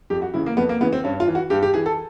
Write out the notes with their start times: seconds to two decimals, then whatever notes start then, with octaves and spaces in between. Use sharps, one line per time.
0.10 F2 G4
0.22 F#4
0.34 C#3 E3 E4
0.46 A#3
0.57 F2 B3
0.69 A#3
0.80 C#3 E3 B3
0.93 C4
1.04 G2 C#4
1.20 F4
1.27 E3
1.35 F#4
1.50 G2 G4
1.63 G4
1.74 E3 G#4
1.86 A4